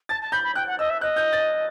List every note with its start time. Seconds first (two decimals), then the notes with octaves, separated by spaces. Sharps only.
0.09 A5 A6
0.21 A5
0.32 B5 G6
0.44 B5
0.55 G5 F#6
0.67 F#5
0.79 D#5 E6
0.90 E5
1.01 D#5 F#6
1.16 G6
1.33 A6